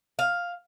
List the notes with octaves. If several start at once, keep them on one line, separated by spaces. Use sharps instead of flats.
F5